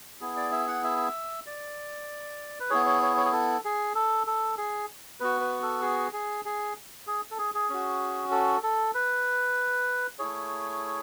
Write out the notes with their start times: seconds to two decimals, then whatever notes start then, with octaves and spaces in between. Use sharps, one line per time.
0.21 B3 E4 G#4
0.37 D5
0.52 E5
0.68 F#5
0.84 E5
1.46 D5
2.60 B4
2.70 B3 E4 G#4 C#5
2.86 C#5
3.02 C#5
3.17 C#5
3.25 G#4
3.32 A4
3.65 G#4
3.95 A4
4.27 A4
4.58 G#4
5.20 B3 F#4 B4
5.41 B4
5.62 A4
5.82 G#4
6.13 G#4
6.45 G#4
7.07 G#4
7.31 A4
7.38 G#4
7.54 G#4
7.70 C#4 F#4
8.31 A4
8.63 A4
8.95 B4
10.19 A3 E4 G#4 C#5